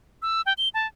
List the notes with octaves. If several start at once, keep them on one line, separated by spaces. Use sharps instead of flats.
E6
G5
G7
A5